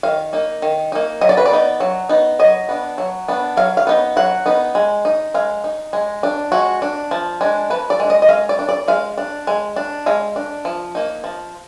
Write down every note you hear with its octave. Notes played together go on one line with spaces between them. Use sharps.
D#3 F5
A#3 D#4
D#3
A#3 D#4
F#3 D#5
D5
B4
D5
B3 D#4
F#3
B3 D#4
F#3 D#5
B3 D4
F#3
B3 D4
F#3 F5
F5
B3 D#4
F#3 F#5
B3 D#4
G#3
D#4
G#3 F5
D#4
G#3
D4
G#3 F#4
D4
F3
G#3 D4
F3 B4
D5
G#3 D4
D#5
D#5
G#3 F5
D5
D4
D5
G#3 F5
D4
G#3
D4
G#3 F5
D4
F3
A#3 D#4
F3